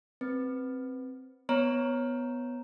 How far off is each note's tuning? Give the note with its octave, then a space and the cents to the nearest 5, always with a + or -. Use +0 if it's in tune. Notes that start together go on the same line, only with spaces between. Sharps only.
C4 +0 B4 +0
B3 +0 C#5 -10 A#5 +0